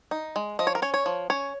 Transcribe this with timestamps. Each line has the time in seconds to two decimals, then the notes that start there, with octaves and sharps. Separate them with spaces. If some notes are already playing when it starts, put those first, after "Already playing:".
0.11 D#4
0.36 G#3
0.59 F3 D#5
0.67 C#5
0.75 A#4
0.82 C#4 C#5
0.94 C#5
1.06 F3
1.30 C#4 C#5